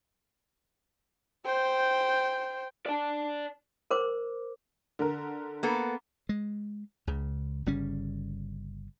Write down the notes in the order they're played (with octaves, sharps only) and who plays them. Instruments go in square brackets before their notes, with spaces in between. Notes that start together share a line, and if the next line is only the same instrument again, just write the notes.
[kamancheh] C5 G5
[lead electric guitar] D5 A5
[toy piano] A#4 C5 D6
[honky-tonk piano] D3 A#4
[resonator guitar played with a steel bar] A#3 B3 A4
[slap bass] G#3
C#2 C#3
G1 C#3 G3 C#4